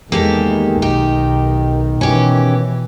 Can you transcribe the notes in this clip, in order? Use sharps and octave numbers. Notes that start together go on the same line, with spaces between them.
E2 D#3 G#3 A#3 G4 A4
B1 D#4 G4
B2 E3 C#4 G4